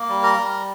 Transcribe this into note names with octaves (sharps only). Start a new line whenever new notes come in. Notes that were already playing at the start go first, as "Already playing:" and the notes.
Already playing: A#3
G3
A#4 A#5
G3